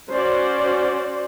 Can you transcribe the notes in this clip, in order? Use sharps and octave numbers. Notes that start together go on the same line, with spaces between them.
C#4 F#4 C5 D5